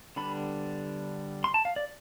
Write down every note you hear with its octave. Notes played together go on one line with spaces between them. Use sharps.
D3 G3 B3 D4 B5
C6
A5
F5
D5